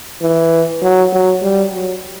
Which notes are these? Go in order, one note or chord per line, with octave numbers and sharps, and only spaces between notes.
E3
F#3
F#3
G3
F#3